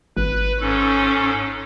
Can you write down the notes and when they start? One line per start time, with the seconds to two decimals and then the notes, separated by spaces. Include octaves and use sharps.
0.17 G#1 B4
0.61 G#2 C#4 A4